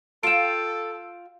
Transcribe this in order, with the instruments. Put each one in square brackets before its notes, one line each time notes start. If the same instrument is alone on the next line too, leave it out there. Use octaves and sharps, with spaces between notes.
[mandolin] F4 G5 [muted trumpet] A4 [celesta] D7 E7